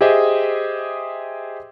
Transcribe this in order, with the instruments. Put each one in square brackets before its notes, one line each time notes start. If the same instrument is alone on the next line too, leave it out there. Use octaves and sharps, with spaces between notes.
[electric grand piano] G4 G#4 C5 D#5 E5